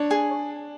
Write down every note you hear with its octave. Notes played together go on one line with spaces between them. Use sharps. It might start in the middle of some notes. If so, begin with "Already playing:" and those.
Already playing: D4 C#5
G#4